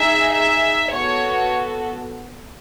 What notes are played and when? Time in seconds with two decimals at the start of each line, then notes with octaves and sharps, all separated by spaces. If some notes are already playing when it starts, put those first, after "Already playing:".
Already playing: D#4 G#4 E5
0.33 E5
0.91 B3 F#4 A4 C#5